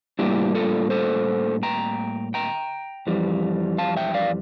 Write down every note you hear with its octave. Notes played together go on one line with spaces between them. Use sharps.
A2 G3 A#3 D4 E4 G4
F4 A4
A4 C5
G5 A#5
G5 A#5
F2 E3 G3
F5 A5
E5 G5
D5 F5